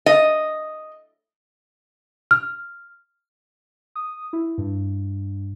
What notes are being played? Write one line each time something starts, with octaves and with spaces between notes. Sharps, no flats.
D#5
F6
D#6
E4
G2